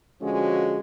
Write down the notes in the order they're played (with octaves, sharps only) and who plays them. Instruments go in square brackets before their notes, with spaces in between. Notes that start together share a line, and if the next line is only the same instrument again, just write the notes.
[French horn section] D3 F3 G#3 C#4 F#4